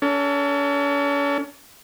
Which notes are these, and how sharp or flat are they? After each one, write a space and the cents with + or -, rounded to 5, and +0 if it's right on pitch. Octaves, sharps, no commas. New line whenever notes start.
C#4 +40 A4 +30